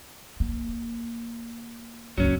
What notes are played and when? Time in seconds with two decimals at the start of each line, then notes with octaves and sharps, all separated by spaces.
0.40 A#3
2.18 F#1 C#2 F#3 C#4